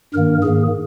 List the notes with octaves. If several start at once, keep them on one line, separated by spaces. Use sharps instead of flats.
G2 D#3 A#3 A#4
G#2 D#3 A#3 G#4